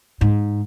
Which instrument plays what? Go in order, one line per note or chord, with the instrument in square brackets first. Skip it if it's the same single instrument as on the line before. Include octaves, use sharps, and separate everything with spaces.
[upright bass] G#2